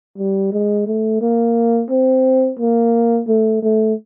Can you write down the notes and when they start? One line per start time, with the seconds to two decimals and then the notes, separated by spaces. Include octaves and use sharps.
0.18 G3
0.52 G#3
0.87 A3
1.21 A#3
1.91 C4
2.59 A#3
3.28 A3
3.62 A3